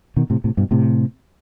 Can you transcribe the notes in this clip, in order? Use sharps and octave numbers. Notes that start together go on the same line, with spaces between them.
B2 D#3
A2 C3
A2 C3
G2 B2
A2 C3